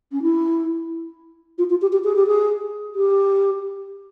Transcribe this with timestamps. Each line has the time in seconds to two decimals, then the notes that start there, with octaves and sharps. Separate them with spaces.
0.12 C#4
0.22 E4
1.58 F4
1.70 F4
1.81 G4
1.92 G4
2.04 G#4
2.15 G4
2.27 G#4
2.95 G4